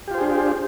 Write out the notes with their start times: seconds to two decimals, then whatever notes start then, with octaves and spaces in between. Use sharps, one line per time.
0.08 G4
0.11 F4
0.14 C5
0.18 G#4
0.21 D4